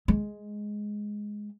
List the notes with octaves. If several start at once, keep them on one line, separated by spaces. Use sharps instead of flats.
G#3